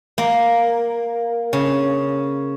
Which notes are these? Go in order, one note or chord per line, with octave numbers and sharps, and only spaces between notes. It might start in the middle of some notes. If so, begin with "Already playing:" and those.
A#3
C#3